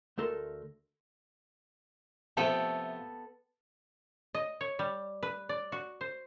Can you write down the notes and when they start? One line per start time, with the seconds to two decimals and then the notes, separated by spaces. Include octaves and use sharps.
0.18 D2 A3 A4 A#4 C6
2.37 C3 F3 A3 B3 A4 G5 A5
4.35 D#5
4.61 C#5
4.79 G3
5.23 B4
5.49 D5
5.72 F#4
6.01 C5